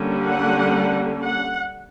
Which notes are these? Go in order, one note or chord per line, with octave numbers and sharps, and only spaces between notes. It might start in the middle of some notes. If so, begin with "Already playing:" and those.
Already playing: D3 G3 A#3 C#4
F#5
F#5